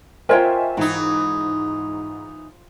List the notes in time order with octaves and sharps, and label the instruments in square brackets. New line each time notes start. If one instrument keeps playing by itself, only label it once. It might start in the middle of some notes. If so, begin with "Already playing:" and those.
[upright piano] F4 C5 [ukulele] A#4 C#5 G5 [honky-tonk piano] D#5 E5 G#5
[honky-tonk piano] G#2 [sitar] E3 D#4